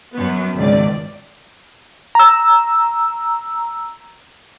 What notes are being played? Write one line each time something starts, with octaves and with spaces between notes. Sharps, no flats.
F#2 B3
G#1 C#2 D5
A#5 E6